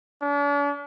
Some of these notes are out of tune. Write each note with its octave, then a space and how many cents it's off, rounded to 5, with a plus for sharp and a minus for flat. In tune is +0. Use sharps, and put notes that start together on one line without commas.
D4 -45